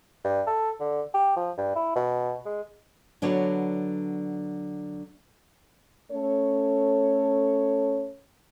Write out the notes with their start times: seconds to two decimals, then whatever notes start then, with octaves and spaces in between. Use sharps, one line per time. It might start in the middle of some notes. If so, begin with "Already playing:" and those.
0.24 G2
0.47 A4
0.80 D3
1.14 G4
1.36 F3
1.57 G2
1.76 E4
1.96 B2
2.46 G#3
3.22 D3 F#3 B3 D4 C#5
6.11 A3 C#4 A4 C#5